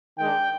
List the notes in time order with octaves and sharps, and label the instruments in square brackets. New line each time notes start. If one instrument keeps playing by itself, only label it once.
[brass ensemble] D#3 G#3 D4 G5